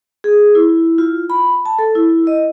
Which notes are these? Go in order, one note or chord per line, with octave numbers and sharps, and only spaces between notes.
G#4
E4
F4
B5
A5
A4
E4
D#5